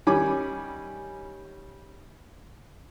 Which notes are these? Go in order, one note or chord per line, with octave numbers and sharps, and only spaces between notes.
D#3 G3 C#4 G#5 B5 D6